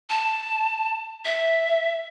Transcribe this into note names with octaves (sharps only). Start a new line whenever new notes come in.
A5
E5